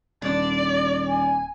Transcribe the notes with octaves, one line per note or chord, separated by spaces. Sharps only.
D#1 D3 D4 D5
G#5